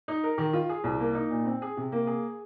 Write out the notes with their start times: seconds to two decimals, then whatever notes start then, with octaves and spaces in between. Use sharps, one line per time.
0.08 D#4
0.24 A#4
0.38 D#3
0.53 F4
0.69 G#4
0.84 C2
1.00 A#3
1.15 D#4
1.30 A#2
1.45 C4
1.62 G#4
1.77 C3
1.92 A#3
2.07 G#4